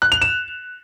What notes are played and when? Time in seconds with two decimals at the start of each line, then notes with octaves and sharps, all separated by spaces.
0.02 F#6
0.12 F7
0.22 E7